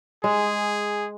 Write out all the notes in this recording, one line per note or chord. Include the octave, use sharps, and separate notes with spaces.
G#3 G#4